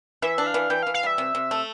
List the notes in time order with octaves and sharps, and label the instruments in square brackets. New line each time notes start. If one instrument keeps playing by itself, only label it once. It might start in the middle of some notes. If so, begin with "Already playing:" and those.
[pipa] E3 [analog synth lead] E5
[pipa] D4
[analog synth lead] F5
[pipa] E3
[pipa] E3 [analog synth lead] G5
[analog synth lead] F5
[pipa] E3
[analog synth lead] F5
[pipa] G3 [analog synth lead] E5
[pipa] C3
C3
A3